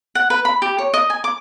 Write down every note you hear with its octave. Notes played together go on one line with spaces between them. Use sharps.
F#5
B4
B5
G4
C#5
D#5
G#5
D6